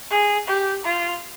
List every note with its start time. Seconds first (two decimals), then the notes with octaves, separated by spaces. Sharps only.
0.11 G#4
0.47 G4
0.85 F4